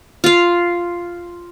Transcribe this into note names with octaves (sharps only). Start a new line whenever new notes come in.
F4 F5